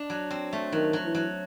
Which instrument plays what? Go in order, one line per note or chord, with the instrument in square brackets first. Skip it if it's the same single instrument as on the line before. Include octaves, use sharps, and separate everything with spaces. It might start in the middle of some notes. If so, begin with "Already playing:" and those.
Already playing: [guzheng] D4
F#3
C4
A3
[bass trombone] D#3 [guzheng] F#3
[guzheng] F#3
[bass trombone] E3
[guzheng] F#3